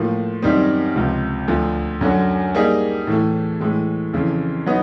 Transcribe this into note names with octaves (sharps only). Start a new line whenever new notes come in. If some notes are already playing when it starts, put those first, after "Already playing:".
Already playing: A2 F3 A#3
F#2 D#3 G3 C4 D#4
C#2 C3 F3
D2 D3 F3
F#2 D3 F#3
G3 A#3 D#4 G#4
A2 E3 A3
A2 E3 G#3
F2 C#3 E3
F#3 B3 D#4